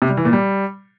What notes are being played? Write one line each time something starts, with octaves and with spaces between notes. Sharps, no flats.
C3
G3
E3
A#2
G3